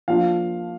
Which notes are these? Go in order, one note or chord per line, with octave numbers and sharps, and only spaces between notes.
F3 A#3 D4 F4 F5